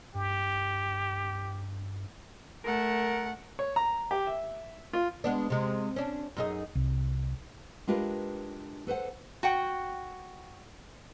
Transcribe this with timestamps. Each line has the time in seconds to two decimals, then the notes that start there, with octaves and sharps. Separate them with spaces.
0.15 G2 G4
2.65 A3 A#4 F#5
3.59 C#5
3.76 A#5
4.11 G4
4.27 E5
4.93 F4
5.24 G#3 B3 D4
5.50 C3 G#3
5.96 C#4 D4
6.37 F#2 D#4 G#4
6.75 C2
7.87 G#3 D4 F4 G4 A#4 B4
8.87 A4 B4 C5 F#5
9.43 F#4 F#5 G5